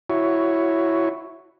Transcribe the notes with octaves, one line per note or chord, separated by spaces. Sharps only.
E4 F#4 C#5